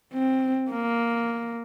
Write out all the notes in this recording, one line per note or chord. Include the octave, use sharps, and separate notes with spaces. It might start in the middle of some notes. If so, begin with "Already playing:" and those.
C4
A#3